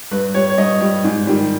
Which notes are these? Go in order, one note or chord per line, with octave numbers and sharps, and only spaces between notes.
G2 B4
G3 C#5
C#5
G2 D#5
G3
G#2
D#3 G3